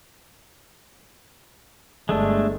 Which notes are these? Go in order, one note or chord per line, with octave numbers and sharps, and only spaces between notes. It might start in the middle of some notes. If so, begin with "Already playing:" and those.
G1 G#3 A3 D4